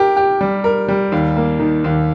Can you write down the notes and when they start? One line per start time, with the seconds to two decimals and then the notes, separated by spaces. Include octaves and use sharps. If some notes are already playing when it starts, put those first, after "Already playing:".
Already playing: G4 A#4
0.17 G4
0.41 G3
0.64 A#4
0.88 G3
1.12 D#2
1.36 A#3
1.59 D#3
1.84 D#2